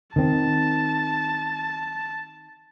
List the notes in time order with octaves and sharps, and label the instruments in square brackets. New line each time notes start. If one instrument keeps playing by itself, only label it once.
[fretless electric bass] D#3 C4 [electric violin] A5